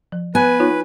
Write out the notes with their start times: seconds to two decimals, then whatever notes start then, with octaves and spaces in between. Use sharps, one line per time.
0.12 F3
0.35 B3 B4 G#5
0.60 D#4 F4 C#5